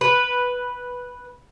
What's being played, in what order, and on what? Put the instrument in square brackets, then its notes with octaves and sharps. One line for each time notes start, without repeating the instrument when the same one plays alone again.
[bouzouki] B4